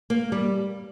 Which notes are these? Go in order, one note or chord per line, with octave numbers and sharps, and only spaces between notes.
A#3
G3